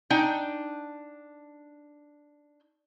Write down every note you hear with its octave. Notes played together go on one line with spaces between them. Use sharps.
D4 D#4 G5 G#5